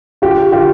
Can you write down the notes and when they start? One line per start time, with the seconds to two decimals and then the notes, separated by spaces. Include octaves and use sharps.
0.22 F4 G4
0.52 F4 G4